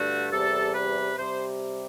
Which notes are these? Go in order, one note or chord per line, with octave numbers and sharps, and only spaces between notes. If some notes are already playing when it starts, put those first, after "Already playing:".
Already playing: G2 D3 A3 F#4
E2 C3 G3 A4
B4
C3 G3 C5